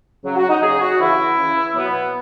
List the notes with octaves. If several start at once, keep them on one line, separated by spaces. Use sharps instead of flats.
C#3 F#3
F#4
D#4
C#3 F#3 G#4
F#4
C#3 E3 E4
C#3 E3
B2 F#3 B3